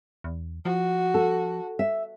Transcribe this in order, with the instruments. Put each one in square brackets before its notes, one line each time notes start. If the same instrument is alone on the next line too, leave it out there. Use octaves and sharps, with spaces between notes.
[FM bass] E2
[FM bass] F3 [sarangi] F#4
[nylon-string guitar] A4
E5